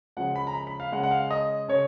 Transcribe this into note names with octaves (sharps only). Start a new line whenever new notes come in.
C#3 F3 G#3 F#5
B5
A#5
B5
B5
F5
C#3 G#3 F#5
F#5
F5
D#5
C#3 C#5